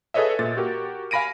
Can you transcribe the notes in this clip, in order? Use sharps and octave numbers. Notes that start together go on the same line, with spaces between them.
G#4 A4 B4 C#5 D#5 E5
A#2 A6
F#4 G4 A#4
F5 G#5 B5 A#6 D7 D#7